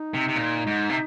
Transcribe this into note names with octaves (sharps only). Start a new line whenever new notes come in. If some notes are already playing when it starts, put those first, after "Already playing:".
Already playing: D#4
C3
C3
A#2
G#2
C3